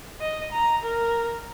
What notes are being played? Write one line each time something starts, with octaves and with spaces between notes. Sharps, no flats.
D#5
A#5
A#4